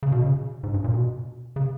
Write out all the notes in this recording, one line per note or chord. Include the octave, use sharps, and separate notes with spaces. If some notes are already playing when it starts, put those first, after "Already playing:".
C#3
B2
C#3
G#2
G2
A#2
B2
C#3